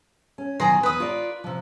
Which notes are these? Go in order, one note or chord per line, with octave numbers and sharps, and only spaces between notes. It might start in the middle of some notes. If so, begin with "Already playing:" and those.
C#4
B2 D#3 F#3 G#4 A#5 C6
E2 B4 D#6
F4 A#4 D5
C3 F3